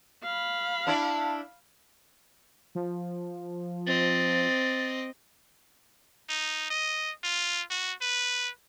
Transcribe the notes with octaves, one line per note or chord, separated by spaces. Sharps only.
F5 B5
D4 E4 D5 A5
F3
C4 D#5 A6
D#4
D#5
F4
F#4
B4